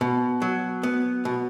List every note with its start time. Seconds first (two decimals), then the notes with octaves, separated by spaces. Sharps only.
0.01 B2
0.42 F#3
0.83 B3
1.25 B2